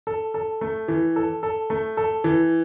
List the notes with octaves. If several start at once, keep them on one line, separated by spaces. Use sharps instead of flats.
A4
A4
A3
E3
A4
A4
A3
A4
E3